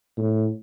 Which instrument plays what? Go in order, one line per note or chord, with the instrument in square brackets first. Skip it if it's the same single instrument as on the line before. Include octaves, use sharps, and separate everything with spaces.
[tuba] A2